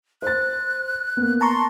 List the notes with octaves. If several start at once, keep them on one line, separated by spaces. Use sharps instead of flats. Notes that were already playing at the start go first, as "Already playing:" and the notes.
C5 F#6 A6
A#3 B3
A5 A#5 C6 C#6